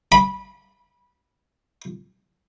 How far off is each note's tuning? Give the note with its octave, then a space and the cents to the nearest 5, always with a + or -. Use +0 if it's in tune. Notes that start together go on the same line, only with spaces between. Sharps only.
B5 -15